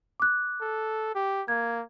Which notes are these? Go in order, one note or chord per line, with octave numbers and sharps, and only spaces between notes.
D6 F#6
A4
G4
A#3 G#6